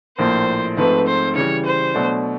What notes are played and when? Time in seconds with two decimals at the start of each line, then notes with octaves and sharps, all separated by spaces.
0.19 A#1 A2 F3 A#3 C5
0.77 G#2 F3 A3 C4 B4
1.07 C5
1.35 C#3 E3 G3 C#5
1.65 C5
1.94 B2 F#3 A3 D4